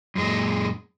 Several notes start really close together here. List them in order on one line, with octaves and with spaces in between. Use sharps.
F#2 G#3 A#2